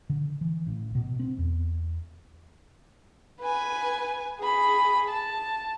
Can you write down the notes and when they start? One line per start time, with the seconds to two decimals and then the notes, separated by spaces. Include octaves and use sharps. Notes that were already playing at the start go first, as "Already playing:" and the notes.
0.10 D3
0.41 E3
0.67 A1
0.95 B2
1.20 C4
1.38 E2
3.40 B4 G#5
4.39 G#4 B5
5.09 A5